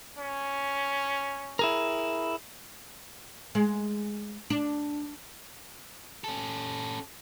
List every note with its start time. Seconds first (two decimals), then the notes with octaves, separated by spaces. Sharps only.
0.18 C#4
1.59 E4 G#4 A#4
3.55 G#3
4.50 D4
6.24 C#4 A4